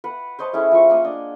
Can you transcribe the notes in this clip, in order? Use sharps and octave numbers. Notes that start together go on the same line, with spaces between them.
B4 F#5
C5 C#5 D#5 A5
A3 C#4 E4 G#4
F3 C#6
A#3 F#5 C6 D#6
D4 D#5